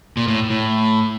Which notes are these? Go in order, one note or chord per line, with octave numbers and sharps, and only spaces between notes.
A#2
A2
A2